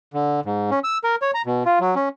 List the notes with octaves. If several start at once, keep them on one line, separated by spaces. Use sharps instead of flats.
D3
G#2
C#4
E6
A#4
C#5
A#5
B2
F4
F#3
C#4